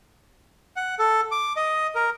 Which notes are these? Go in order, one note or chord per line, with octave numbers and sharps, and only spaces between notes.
F#5
A4
D6
D#5
A#4